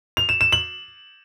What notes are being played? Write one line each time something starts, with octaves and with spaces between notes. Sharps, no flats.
F7
E7
E7
F#7